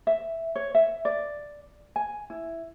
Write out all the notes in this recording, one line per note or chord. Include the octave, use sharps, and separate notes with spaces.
E5
C#5
E5
D5
G#5
E4